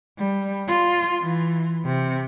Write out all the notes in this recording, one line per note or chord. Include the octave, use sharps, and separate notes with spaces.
G3
F4
E3
C3